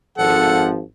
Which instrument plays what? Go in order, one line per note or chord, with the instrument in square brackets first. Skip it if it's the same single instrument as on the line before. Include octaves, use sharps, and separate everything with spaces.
[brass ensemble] G#1 F3 [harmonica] A4 F#5